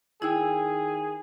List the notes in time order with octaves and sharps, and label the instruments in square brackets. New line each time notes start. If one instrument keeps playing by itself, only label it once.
[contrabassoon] D#3 [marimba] E4 [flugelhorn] G#4 [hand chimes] G5 E6 G#6